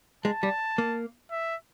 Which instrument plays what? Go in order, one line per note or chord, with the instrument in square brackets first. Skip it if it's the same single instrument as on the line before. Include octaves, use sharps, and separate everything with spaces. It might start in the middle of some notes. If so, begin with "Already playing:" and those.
[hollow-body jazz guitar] G#3 [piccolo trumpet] A5
[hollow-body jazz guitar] G3
A#3
[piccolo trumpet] E5